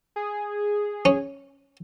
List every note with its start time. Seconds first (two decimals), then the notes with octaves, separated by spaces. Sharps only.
0.16 G#4
1.05 C#4